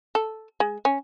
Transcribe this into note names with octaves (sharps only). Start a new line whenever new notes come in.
A4
G#3
C#4